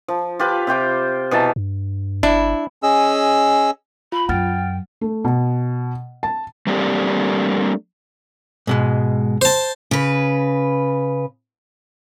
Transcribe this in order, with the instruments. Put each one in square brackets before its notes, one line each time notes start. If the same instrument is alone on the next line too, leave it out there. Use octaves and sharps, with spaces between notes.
[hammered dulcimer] F3
F4 G4 B4
C3 C5 G5 D6
B2 E3 A5 A#5
[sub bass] G2
[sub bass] G1 [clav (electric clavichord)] D4 [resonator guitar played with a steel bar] E4
[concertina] C#4 G#4 D#5 E6
[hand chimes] F4 [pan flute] B5
[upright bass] F#2 [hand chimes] F#5 F6 A6 [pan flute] G5
[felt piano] A3
B2
A5
[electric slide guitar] G3 A3 A#3 C4 D4 G4
[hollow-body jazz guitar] G#2 B2 G#3
[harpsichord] C5 A5
[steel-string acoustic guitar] C#3 B4